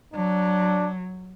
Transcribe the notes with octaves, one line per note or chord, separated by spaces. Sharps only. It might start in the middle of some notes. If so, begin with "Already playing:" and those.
F#3 D4